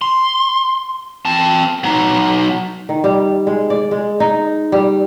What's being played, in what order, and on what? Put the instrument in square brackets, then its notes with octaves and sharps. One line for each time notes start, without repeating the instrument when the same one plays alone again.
[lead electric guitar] C6
C4 A5
F#3 D#4
[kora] D#3
G3
G#3
D5
G#3
D#4
G3